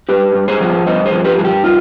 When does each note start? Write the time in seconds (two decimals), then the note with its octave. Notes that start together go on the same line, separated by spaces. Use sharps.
0.09 G2 G4 B4
0.34 G2
0.48 G#4 C5
0.60 F3
0.86 G2 C5 D#5
1.06 G#4 C5
1.12 F3
1.25 G4 B4
1.38 G2 G#4
1.44 G4
1.63 D#4 F4